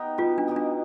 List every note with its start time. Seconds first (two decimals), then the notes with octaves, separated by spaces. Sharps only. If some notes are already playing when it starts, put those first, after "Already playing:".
Already playing: B3 D#4 G4
0.18 B2 F4
0.38 D4
0.48 B3 D#4 G4
0.56 D4